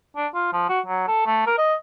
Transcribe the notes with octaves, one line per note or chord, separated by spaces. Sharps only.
D4
F4
F3
F#4
F#3
A4
A3
A#4
D#5